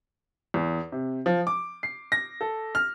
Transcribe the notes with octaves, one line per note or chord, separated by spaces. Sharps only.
E2
C3
F3
D6
C7
A#6
A4
F6